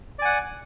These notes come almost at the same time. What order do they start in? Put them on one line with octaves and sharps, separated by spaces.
D5 G#5 F#5